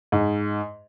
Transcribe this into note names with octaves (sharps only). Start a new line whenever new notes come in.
G#2